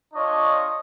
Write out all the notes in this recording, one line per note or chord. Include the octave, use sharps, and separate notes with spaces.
D4 F4 C#5 D#5 C#6